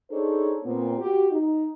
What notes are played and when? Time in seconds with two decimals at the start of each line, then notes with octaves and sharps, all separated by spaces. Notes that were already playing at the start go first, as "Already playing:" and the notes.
0.11 D4 D#4 G#4 A4 C5 C#5
0.64 A#2 B3 C4
0.99 F#4 G4
1.31 D#4